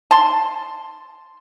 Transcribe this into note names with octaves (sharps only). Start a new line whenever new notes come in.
A5 C6